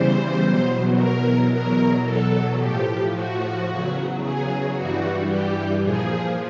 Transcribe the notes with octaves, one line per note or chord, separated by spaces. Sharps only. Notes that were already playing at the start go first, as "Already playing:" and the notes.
Already playing: E2 C#3 E3 G3 C5
E2 B2 F#3
A#4
E2 B2 F#3 A#4
A4
A2 F3 G4
F#4
E2 C#3 F#3
G#4
G2 E3 G3 F#4
G4
A#2 F3 G#4